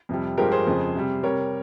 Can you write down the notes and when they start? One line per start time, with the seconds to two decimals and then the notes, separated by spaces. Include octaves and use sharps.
0.09 F2 C3 G3
0.38 G2 F3 G#3 G4 A#4
0.51 G#4 C5
0.67 F2 C#3 G#3
0.95 C3 G3
1.23 C3 G3 A#4 C#5